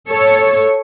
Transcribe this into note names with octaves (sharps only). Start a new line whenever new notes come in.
A4 C#5